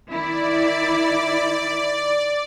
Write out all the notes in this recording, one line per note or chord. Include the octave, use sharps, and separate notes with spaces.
D#3 E4 D5